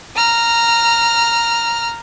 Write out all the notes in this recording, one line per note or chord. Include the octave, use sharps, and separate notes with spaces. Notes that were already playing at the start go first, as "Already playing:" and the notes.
A#5 F6